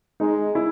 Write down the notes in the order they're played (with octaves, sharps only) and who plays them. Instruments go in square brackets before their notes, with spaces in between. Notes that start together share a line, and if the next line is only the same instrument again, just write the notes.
[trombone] G#3 [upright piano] D#4
[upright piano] E4